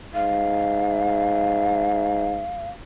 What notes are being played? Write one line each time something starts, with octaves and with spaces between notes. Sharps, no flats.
G#2 F5